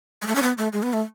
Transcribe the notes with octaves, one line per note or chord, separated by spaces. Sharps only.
G#3
A3
C#4
B3
A3
G#3
B3
A3